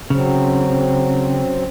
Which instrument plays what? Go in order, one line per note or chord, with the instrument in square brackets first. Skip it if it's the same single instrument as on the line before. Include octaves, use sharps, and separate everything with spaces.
[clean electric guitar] C#3 [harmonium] F#3 C4